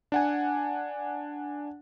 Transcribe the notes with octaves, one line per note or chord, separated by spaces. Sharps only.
D4 F#5 G#5